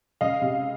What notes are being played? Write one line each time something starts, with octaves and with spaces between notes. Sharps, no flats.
C#2 D#5 F5
C3